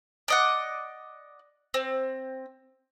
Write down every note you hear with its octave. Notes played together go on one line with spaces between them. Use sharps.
D5 D#5 F#5
C4